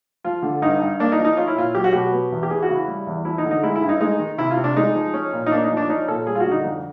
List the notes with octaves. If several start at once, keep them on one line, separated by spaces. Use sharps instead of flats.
F3 F4
D3
G2 D#4
G2
A#3 D4
D#4
F3
D#4
C#4 F4
E4
A#2 F4
F#3 G4
F#4
B2 G4
B3
E2
G4
E3 G#4
F#4
C#3
E4
G3
E2
F3 E4
D#4
D3
D#4
G#3 E4
E4
G2
D#4
G#3 D#4
D#3
C3 E4
F4
C3
D4
G#3 D#4
F3
C#4
A#2
D#4
A#3 D4
D#4
F3
D4
C#4 D#4
A#2 A4
G3 G#4
F4
F#4
D3
D#4
F2